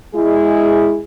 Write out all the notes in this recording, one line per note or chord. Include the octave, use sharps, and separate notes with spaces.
G#3 E4 G#4